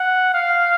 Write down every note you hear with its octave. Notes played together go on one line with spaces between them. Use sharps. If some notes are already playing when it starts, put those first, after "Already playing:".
Already playing: F#5
F5